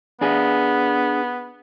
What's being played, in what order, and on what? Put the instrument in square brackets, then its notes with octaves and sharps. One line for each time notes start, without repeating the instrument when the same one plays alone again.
[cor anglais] B3 [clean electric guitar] D4 G#4